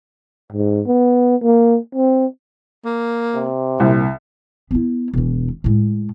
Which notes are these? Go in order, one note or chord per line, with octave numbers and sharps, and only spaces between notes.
G#2
B3
A#3
C4
A#3
C3
C2 A#2
B3 E4
E1 E3
A2 G#3